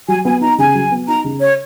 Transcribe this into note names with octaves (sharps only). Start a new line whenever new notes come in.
F#3 G#5
B3 G#5
D#4 A#5
C#3 G#5
F#3
B3
D#4 A#5
C#3
C#5